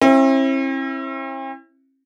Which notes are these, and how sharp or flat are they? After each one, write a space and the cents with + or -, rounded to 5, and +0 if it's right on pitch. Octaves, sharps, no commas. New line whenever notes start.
C4 +45 E4 +0